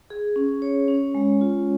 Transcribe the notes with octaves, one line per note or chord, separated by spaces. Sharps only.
G#4
C#4
C#5
C#4
G#3
F4